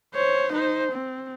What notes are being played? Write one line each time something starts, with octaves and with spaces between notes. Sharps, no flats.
C5 C#5
D#4 C5
C4